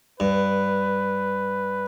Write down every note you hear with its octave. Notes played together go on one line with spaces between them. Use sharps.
G2 B4